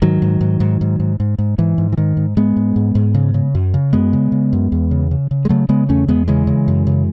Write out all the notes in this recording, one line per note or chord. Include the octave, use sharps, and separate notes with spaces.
G#2 D#3 F#3
G#2
G#2
G#2
G#2
G#2
G#2
G#2
G#2 E3
G#2
E3
G#2 D#3
G#2
G#2 G#3 B3
G#2
G#2
G#2
C#3
C#3
F#2
C#3
F#2 G#3 B3
C#3
C#3
F#2
E2
C#3
C#3
C#3
G#3
C#3 F#3 A3
C#3 G#3 B3
E2 A3 C#4
E2 G#3 B3
C#3 E3 G#3
C#3
F#2
C#3